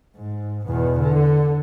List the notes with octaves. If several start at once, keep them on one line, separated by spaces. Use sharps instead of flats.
G#2
E2 B2
D3